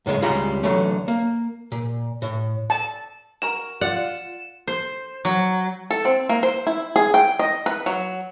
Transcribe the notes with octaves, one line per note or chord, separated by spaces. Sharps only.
F#2 A2 C#3 G3 G#3
C#2 G3 G#3 F4 A#5 B5
D3 E3 F#3 A3
A#3
A#2
A2
A5
F#4 A#4 A#5 E7
F4 D5 F#5
C5
F#3
A4
C4
A#3
C5
E4
G#4
G5
D#5
B4
F#3